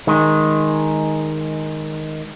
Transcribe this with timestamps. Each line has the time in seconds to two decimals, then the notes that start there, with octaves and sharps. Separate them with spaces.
0.07 D#3 G#3